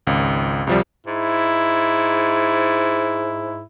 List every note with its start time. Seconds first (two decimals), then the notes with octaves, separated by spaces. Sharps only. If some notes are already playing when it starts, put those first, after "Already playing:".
0.07 G#1 C#2
0.67 C2 F3 G3
1.06 G#2 E4